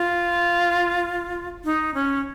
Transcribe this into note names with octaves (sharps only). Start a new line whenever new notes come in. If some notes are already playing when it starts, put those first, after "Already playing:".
Already playing: F4
D#4
C#4